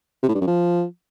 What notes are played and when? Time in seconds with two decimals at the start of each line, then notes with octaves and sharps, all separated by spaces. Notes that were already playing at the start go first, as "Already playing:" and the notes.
0.23 C3
0.29 A2
0.35 G2
0.41 F#2
0.47 F3